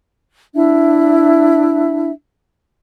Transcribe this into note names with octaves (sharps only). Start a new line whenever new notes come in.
D4 E4 E5